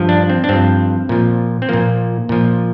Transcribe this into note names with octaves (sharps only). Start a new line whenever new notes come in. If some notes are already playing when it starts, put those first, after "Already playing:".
Already playing: G2 F3
D4
C4
D4
G2 F3 C4
A#2 F3
C4
A#2 F3 A#3
A#2 F3